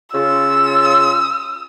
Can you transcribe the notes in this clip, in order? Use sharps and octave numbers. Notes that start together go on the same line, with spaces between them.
C#3 F4 E6